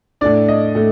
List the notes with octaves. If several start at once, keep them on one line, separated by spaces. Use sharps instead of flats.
A2 A3 D4 D5
D#5
A2 A3